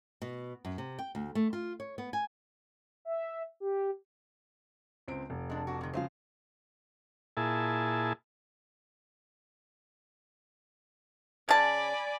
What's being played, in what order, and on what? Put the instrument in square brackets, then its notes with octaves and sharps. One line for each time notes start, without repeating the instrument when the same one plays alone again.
[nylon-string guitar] B2
F#2
C3
G5
D2
A3
F4
C#5
B3
G#5
[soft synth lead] E5
G4
[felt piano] C#2 C4 D7
F1
[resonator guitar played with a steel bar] G#3 D4
D4 F#4
C3 D#3
[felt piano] C#3 F3 [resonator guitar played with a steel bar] C5 D#5 F5
[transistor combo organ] A#2 E4 G#4 A5
[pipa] C#3 A5 [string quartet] D5 G#5 B5